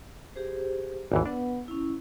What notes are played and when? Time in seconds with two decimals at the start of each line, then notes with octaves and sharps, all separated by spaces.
0.36 G4 G#4 C5
1.12 G#1 D#2 E3
1.26 B3 D4 B4 F#5
1.68 C#4 E4